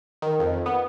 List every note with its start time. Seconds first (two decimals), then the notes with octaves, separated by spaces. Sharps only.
0.22 D#3
0.39 F2
0.66 B3